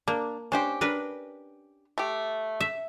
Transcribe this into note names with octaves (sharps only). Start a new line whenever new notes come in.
A#3 D4
C#4 D4 G4 C5
D4 A#4 B4
A3 G4
E5